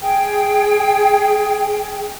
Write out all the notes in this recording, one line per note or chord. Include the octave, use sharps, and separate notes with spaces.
G#4 G5